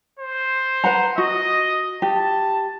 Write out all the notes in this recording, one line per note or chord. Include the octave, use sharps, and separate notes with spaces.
C5
B4 F#5 A#5
F#4 D#5
G4 A5